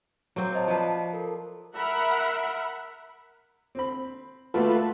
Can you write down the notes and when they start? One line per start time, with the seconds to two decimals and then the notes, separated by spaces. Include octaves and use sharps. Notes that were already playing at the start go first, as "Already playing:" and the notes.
0.36 F#3 A#3 C4
0.53 C5 D#5 A5
0.68 F3 B4 D5
1.13 A4 A#4
1.75 A#4 E5 F#5 B5
3.75 C4 B5
4.54 A3 A#3 F4 F#4 A4 B4